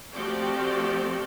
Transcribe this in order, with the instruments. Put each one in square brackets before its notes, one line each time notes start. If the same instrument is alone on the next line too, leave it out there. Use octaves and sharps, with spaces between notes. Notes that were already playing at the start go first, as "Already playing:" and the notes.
[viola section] F3 A3 C4 F#4 G4 D5